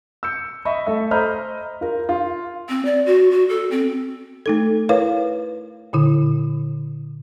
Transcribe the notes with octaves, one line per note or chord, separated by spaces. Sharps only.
E6 G6 C#7
D#5 E5 B5 C#6
A3 A4 D#5 E5
C5 D#5 A#5 B5 F6 G6
F4 A#4
F4
C4
D5
F#4
F#4
A4
C4
A3 D#4 A4
E4 A#4 B4 C#5 F5
A#2 D3 E4